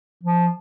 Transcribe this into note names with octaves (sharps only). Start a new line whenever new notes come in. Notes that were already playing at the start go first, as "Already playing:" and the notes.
F3